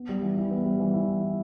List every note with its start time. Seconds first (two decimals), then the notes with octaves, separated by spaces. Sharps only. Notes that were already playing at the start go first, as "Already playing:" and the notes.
Already playing: B3
0.09 G3
0.22 E3
0.37 E4
0.51 B3
0.65 G3
0.80 E3
0.94 E4